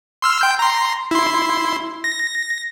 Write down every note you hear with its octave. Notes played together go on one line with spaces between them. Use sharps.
C6 E6 F6
G5 G6
A#5 C6
E4 C6
A#6